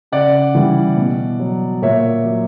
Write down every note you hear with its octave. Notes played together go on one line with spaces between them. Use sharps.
C#3 D5 F#5
E3 G3
B2
F#3
A#2 C#5 E5
F#3